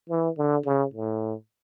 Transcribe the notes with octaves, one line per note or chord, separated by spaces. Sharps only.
E3
D3
C#3
A2